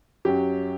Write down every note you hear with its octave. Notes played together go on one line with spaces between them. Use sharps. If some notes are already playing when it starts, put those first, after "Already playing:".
F#2 F#3 G4